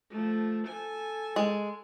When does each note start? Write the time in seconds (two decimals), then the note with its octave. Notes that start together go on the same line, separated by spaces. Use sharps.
0.10 F3 A3
0.67 A4 G#5
1.36 G#3